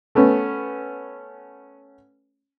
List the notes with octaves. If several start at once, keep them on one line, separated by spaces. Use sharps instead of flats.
A3 B3 C#4